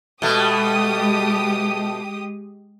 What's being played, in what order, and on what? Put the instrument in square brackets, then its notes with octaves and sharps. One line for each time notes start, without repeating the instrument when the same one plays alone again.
[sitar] B2 A3 [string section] G#3 G4 D#6